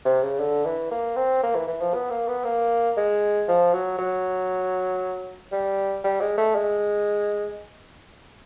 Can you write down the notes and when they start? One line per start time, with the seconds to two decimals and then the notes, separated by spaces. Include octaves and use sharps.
0.05 C3
0.23 C#3
0.39 D3
0.65 E3
0.91 A#3
1.16 C4
1.43 A#3
1.55 E3
1.68 E3
1.81 F3
1.94 B3
2.10 A#3
2.28 B3
2.45 A#3
2.97 G#3
3.48 F3
3.73 F#3
3.98 F#3
5.52 G3
6.04 G3
6.21 G#3
6.38 A3
6.55 G#3